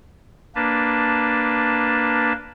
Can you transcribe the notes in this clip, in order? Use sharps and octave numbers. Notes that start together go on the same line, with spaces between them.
A#3 D4 B4 A5